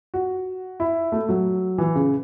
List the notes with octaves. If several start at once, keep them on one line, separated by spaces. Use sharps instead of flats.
F#4
E4
A3
F#3
E3
C#3